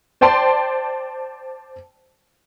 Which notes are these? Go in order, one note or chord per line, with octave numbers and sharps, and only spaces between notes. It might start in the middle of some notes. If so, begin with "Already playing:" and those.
C5 D5 G5 A5 C6